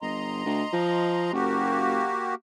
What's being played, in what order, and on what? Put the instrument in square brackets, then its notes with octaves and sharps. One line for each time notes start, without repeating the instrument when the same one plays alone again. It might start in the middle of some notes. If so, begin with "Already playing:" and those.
[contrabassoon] G1 [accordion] D#5 A#5 C6
[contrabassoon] D2
F3
[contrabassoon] F#1 [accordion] A#3 F#4 G4